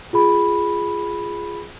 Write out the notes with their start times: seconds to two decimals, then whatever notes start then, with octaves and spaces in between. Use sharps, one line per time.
0.13 F4 G#4 B5